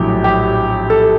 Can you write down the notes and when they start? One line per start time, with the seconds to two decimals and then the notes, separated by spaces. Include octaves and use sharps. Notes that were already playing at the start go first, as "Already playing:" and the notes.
Already playing: A#1 A2 F#3 G4
0.24 G4
0.90 A4